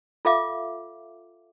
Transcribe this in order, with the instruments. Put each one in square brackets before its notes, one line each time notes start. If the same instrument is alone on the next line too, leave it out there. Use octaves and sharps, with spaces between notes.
[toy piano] F4 A4 E5 F5 D6